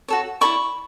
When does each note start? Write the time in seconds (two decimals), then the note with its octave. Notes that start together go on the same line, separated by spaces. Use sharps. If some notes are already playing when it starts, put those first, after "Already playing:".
0.08 F#4 A4 C#5
0.41 E4 A4 D5 B5 C#6